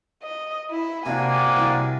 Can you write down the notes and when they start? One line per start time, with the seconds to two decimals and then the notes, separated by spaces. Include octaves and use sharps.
0.23 D#5
0.70 E4 E5
1.06 C3 A#3 C4 D4 F#4 G#5
1.57 C2 D3